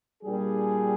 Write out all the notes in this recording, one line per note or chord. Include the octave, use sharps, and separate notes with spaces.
A#2 G3 D4 G#4